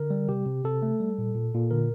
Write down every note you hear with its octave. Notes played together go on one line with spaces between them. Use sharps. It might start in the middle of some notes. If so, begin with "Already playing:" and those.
Already playing: D3 A#4
G3
C3 G4
C3
C3 A4
A3
G3
A#2
A#2
A#2
D3 A#4